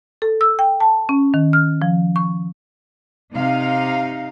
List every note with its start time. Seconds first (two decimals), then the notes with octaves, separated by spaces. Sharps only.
0.22 A4
0.41 E6
0.59 G5
0.80 A5
1.09 C#4
1.34 D#3
1.53 F6
1.82 F3
2.16 C#6
3.33 C3 D#4 F5